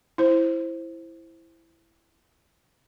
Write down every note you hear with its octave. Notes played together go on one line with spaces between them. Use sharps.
E4 C5